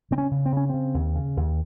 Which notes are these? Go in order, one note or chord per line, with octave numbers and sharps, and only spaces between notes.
C#3 C4
C#4
C#3
C4
C#3 C#4
C#3 C4
D#2
C#3
D#2